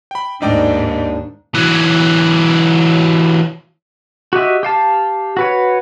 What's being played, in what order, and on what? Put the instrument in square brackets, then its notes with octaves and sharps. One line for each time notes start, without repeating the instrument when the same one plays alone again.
[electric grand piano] G5 B5
[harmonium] D#2 D4 [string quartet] G#2 [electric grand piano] D#4 D5 G5
[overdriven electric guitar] E3 F#3
[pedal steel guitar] F#4 G4 D#5 E5
G4 F5 A5
F#4 B4 C#5